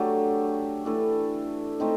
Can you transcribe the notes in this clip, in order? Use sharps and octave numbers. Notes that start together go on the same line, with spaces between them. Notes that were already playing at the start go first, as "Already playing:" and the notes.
Already playing: F#3 A3 D4 G4
E3 A3 D4
A3 C4 D#4